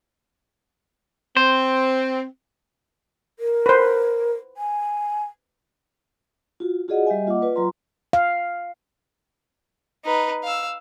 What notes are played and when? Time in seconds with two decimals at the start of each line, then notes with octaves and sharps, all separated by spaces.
1.37 C4 C5
3.39 A#4
3.66 B4 C5
4.57 G#5
6.60 F4 F#4
6.88 F4 F#4 G#4 D5 D#5 F#5
7.06 G3 G4 D#5 E5 G#5
7.26 A#3 F4 D#5 F#5 D6
7.42 F4 B4 D5
7.56 F#3 F4 A#5 C6
8.13 F5
10.05 D#4 B4
10.44 F5 E6